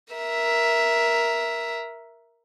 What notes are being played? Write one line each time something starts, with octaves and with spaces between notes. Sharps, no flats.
A#4 E5